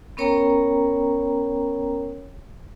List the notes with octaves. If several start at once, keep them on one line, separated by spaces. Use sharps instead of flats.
B3 C#4 A#4 C#5 G5 A#5